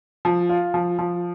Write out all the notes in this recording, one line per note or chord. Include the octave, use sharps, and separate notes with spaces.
F3
F4
F3
F3